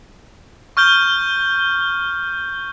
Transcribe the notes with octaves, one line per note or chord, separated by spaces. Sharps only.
C#6 F6 G6 G7